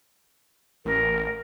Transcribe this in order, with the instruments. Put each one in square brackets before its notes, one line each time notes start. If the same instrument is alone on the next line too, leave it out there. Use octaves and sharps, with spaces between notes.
[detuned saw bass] A1 [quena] A#4